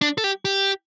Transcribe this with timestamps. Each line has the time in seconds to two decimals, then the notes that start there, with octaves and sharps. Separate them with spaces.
0.01 D4
0.18 A4
0.24 G4
0.45 G4